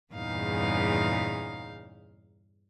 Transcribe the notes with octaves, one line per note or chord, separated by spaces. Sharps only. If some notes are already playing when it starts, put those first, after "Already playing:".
E2 G2 A#2 C#3 D#4 F5